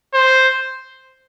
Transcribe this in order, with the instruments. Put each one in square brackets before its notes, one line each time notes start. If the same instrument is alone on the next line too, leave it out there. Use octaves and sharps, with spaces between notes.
[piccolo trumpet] C5